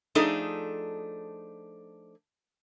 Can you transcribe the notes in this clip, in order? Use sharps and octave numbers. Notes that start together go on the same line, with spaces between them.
F3 A3 D4 D#4 G#4 A4